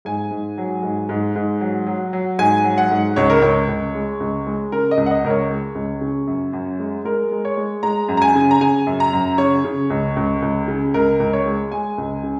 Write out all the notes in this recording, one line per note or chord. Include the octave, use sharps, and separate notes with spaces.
G#2 G#5
G#2
F#3
G#2
G#2
G#2
F#3
F#3
F#3
G#2 G#5
F#3
F#5
G#2
C#2 C#5
A#4
C#2 C#5
C#2
G#3
C#2
G#3
C#3 A#4
D#5
C#2
F#5
D#5
C#2 A#4
C#5
G#3
C#2
C#3
F#2
F#2
G#3
G#3 A#4
G#3
C#5
G#3
G#3 A#5
F#2
A#5
G#5
C#3
A#5
C#3 G#5
F#2
A#5
F#2
C#3 C#5
C#3
C#2
C#2
C#2
C#3
C#2 A#4
C#2
C#5
G#3
G#3 G#5
C#2
C#3